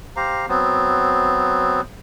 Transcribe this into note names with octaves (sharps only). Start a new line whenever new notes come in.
G4 C5 F5 A#5
F#3 B3 C4